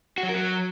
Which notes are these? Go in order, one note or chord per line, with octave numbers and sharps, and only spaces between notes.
F#4
F#3
A#4
F#3